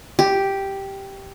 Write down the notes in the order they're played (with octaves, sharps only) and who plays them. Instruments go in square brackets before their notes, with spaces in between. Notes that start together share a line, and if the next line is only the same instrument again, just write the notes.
[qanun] G4